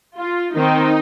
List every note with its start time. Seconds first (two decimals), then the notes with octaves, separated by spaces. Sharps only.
0.17 F4
0.54 D#3 C4 D#4